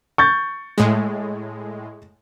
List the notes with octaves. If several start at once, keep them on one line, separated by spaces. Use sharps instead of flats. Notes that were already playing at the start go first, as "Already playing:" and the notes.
C#6 G6 A6
A2 G#3